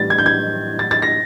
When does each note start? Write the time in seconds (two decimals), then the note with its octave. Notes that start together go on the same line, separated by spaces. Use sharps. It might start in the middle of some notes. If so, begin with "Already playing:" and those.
Already playing: A2 E3 G3 A6
0.10 G#6
0.18 G6
0.26 G#6
0.79 A6
0.91 A6
1.02 A#6